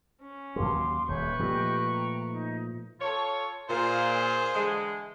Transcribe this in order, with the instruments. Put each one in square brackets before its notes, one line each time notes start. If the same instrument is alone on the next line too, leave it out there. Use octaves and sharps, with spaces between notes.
[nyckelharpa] C#4
[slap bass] D#2 F#3 [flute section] F5 C6 D6
[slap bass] D#1 [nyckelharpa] B4 C#6 [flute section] C#5 E5 G6
[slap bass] A#2 F3 A3 [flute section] G4 D#5
[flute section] G5 A#5
D#4
[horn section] F4 A4 C#5
[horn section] A#2 [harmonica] F4 G#4 C5
[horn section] D3 E3 G#3